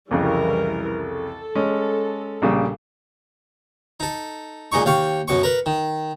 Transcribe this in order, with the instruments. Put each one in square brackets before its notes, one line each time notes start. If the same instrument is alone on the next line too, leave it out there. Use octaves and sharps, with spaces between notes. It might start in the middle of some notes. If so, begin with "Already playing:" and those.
[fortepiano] C2 F2 C#3 [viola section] E3 G3 A#4
[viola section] A4
[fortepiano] G#3 C#4
A#1 C#3 G3
[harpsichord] D#4 A4
A#2 G#3 D#4 C#6
D#2 F5 G5 C#6
F#2 B2 C#6
A#4 B4
D#3